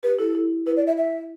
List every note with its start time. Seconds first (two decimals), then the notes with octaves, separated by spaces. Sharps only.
0.03 G4 B4
0.19 E4 A4
0.35 E4
0.66 E4 B4
0.77 D5
0.87 E5
0.98 E5